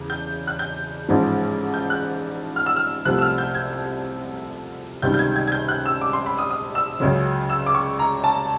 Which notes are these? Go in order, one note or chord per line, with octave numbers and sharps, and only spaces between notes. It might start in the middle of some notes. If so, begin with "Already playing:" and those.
Already playing: E2 C#3
G6
F#6
G6
A1 G#2 F3 G#3
G6
F#6
F6
E6
F6
C2 C3 F3 A3 F#6
E6
F6
G6
G#6
C#2 C3 D#3 G3 G6
G6
G#6
G#6
G#6
G6
F#6
E6
D6
C6
B5
D#6
D#6
E6
C#2 C#3 F#3
E6
D6
C#6
A#5
A5